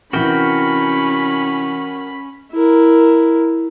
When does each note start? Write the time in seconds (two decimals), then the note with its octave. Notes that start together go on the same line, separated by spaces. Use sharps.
0.13 C3 E3 C#4 F#4 A#4 G5 B5
2.52 E4 A#4